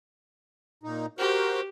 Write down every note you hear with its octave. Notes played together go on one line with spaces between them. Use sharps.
A#2 D#4
F#4 G4 A#4 C5